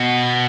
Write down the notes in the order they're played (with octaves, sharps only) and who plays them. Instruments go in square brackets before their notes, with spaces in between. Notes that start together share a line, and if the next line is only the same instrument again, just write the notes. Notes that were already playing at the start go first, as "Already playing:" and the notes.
Already playing: [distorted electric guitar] B2